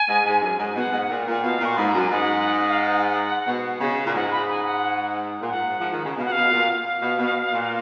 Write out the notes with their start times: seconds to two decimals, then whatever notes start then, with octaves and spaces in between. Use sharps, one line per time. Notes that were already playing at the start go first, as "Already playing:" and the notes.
Already playing: G#5
0.08 G#2
0.26 G#2
0.42 F#2
0.59 G#2
0.76 B2 F#5
0.92 G#2
1.10 A#2
1.27 A#2
1.43 B2 F5
1.60 A#2 C#6
1.76 G#2 B5
1.88 A#5
1.94 F#2
1.99 G#5
2.11 G#2 F#5
2.69 F5
2.80 F#5
3.47 B2
3.80 C#3
4.06 A#2
4.14 G#2 F#5
4.31 B5
4.49 G#5
4.65 F#5
5.42 A#2
5.49 G#2 F#5
5.80 F3
5.93 D#3
6.05 C#3
6.17 B2 F5
6.25 F#5
6.31 B2 F5
6.51 A#2
6.85 F5
7.02 B2
7.19 B2
7.53 A#2